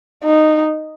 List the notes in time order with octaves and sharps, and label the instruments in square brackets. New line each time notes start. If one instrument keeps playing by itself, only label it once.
[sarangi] D#4